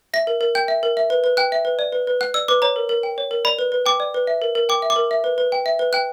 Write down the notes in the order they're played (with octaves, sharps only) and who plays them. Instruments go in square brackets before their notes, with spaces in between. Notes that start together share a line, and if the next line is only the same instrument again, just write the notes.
[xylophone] E5 A#6
A#4
A#4
G5 G6
E5
A#4
E5
B4
B4
G5 F#6
E5
B4
D5
B4
B4
F#5 F#6
D5 E6
B4 D6
C#5 A#5
A#4
A#4
G5
C#5
A#4
D5 B5
B4
B4
G5 D6
D5
B4
E5
A#4
A#4
G5 D6
E5
D6
A#4
E5
B4
B4
G5
E5
B4
G5 F#6